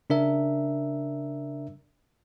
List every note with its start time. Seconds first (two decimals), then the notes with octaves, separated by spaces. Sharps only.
0.10 C#3 D4 A#4 E5